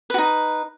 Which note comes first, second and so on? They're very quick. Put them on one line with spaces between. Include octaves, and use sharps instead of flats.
B4 F#4 D#4